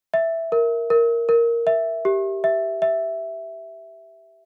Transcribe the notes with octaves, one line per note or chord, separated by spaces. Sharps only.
E5
A#4
A#4
A#4
E5
G4
E5
E5